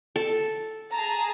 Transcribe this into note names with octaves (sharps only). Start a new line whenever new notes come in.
A4
G#4 A5 A#5